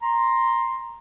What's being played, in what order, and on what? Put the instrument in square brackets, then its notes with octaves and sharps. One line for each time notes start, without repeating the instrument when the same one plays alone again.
[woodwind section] A#5 C6